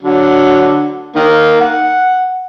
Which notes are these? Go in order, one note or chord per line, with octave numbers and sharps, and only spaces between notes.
D3 F#3
D#3 A#3
F#5